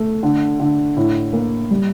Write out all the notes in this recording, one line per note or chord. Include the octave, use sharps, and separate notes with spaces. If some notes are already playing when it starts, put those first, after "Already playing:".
Already playing: A3
D3
D3
A2
A#3
G3